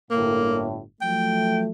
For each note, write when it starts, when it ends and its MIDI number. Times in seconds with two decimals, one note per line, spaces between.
0.11 0.80 31
0.11 0.80 45
0.11 0.69 58
1.02 1.71 53
1.02 1.71 54
1.02 1.71 57
1.02 1.61 79